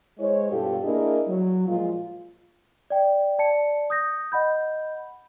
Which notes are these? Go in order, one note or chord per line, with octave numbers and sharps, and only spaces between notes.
G#3 E4 C5 C#5
G2 B2 F4 G4 A4
A#3 D4 E4 G#4 A#4 D#5
F#3
A#2 F3 G#3 F4
D5 G5
D5 A5 C#7
D#6 G6 A#6
D#5 F#5 B5 G6